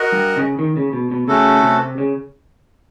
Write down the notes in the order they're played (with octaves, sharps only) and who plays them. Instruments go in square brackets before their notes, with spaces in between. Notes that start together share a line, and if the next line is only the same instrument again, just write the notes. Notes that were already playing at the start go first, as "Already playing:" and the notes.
Already playing: [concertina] F#4 A#4 D#5 F#5
[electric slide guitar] G2
C#3
D#3
C#3
B2
B2
[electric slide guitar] C#3 [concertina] A3 C#4 F#4 A4
[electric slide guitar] C3
C#3